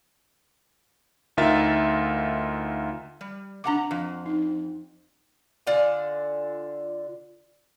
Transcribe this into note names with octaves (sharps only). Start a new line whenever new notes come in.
D2 D#4 F4 A#4 E5 A6
G3
C3 D4 F#5 A#5 D6
F2
D#4
D3 F4 D5 G#5